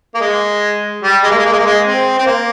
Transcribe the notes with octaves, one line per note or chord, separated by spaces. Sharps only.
A#3
G#3
G3
G#3
A#3
G#3
A#3
G#3
A#3
G#3
C4
C4
A#3